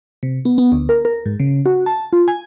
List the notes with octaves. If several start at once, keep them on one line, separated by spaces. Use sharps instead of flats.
C3
B3
B3
D2
A#4
A#4
G#2
C#3
F#4
A5
F4
G#5